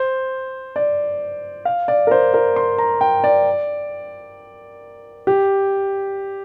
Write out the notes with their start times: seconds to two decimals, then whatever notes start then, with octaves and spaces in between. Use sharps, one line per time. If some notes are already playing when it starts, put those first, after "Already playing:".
Already playing: C5
0.76 D5
1.65 F5
1.88 D5
2.07 A#4
2.11 C5
2.34 A#4
2.56 C6
2.78 A#5
3.01 G5
3.24 D5
5.27 G4